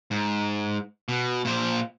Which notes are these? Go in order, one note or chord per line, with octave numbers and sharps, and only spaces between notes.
G#2
B2
A#2 C5